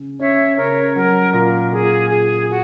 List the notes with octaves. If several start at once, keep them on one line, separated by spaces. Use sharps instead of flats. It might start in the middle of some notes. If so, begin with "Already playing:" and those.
Already playing: C#3 C#4
C#4 C#5 E5
C#3 A#4 C#5
F#3 A#4
A#2 A#4
A#2 G#4
A#2 G#4
F#4 G#4